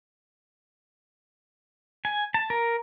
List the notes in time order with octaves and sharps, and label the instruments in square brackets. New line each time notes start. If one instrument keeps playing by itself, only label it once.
[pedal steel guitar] G#5
A5
A#4